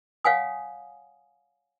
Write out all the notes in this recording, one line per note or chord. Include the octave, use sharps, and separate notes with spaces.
C#5 F5 F#5 G#5 D#6